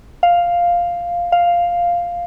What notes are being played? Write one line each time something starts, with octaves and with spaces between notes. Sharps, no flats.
F5
F5